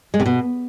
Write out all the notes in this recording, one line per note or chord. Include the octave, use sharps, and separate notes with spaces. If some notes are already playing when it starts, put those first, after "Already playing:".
G#3
C3
B2